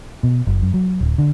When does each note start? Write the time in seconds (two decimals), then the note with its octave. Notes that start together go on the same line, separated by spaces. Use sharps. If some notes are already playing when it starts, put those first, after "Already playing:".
0.23 B2
0.47 F#1
0.62 F#2
0.74 F#3
1.01 D1
1.18 D3